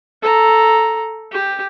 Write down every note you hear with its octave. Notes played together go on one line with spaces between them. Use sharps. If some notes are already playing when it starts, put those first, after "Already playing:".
A4 A#5
G4